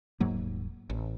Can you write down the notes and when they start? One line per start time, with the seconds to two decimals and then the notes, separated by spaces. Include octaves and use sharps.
0.20 D#1 G#2 F#3 A#3
0.90 A1